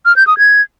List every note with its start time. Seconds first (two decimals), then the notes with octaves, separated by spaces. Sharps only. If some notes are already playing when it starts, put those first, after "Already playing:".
0.06 F6
0.16 G6
0.27 D#6
0.38 G#6